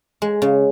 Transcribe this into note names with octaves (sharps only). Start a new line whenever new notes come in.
G#3
C#3